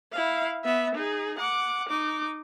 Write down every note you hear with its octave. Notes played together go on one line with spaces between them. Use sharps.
E4 F5
B3 E5
D#4 G#4
F#5 D6
D#4 D6